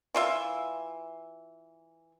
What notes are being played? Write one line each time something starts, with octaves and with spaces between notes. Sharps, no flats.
E3 F4 E5